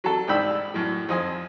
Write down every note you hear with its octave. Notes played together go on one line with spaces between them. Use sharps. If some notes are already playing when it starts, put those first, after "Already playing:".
F#3 A4
C2 G#2 D4 G5 B5 E6
F#2 A2
F2 F3 D#5 G#5